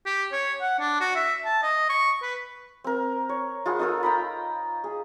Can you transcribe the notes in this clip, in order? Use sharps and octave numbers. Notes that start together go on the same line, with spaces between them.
G4
C#5
F#5
D4
F#4
E5
A5
D#5
C#6
B4
C4 A#4
C#5
F4 G#4 F#5 B5
D#4 F4 A4 A#4
G5 A#5 B5
G#4